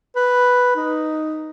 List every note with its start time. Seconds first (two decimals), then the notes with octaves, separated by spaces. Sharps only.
0.16 B4
0.76 D#4